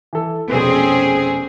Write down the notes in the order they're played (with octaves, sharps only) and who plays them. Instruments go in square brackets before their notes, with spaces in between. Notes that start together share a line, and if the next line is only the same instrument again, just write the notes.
[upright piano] E3 A4
[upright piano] F1 B2 B4 [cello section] C4 C#4 G#4